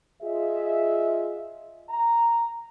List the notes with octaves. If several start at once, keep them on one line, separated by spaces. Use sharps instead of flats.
F4 G#4 D#5 E5
A#5